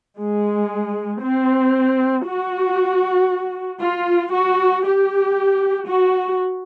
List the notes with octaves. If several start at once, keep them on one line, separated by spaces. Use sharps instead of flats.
G#3
C4
F#4
F4
F#4
G4
F#4